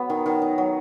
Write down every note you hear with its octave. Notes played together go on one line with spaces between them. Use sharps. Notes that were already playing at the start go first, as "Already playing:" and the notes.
Already playing: F#3 B3
D#3
D#3
D#4
F#3